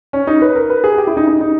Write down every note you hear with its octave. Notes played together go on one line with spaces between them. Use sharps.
C#4
D#4
B4
A#4
B4
G#4
G4
E4
D#4
D#4
D#4